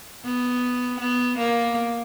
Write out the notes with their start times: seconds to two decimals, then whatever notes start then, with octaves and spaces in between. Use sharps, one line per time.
0.25 B3
1.00 B3
1.38 A#3